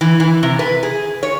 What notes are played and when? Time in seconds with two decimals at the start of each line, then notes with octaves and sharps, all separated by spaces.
0.01 E3
0.20 E3
0.43 C3
0.59 B4
0.83 G#4
1.23 C#5